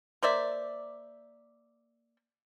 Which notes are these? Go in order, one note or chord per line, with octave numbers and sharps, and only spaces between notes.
A#3 C5 D5 E5